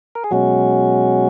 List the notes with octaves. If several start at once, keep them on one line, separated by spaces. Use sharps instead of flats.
A#4
G#4
B2 F#3 G#3 C#4 F#4